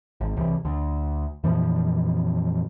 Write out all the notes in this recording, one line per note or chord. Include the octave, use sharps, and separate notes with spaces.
G#1
C2 C3 E3
D2
F2 A#2 E3 F3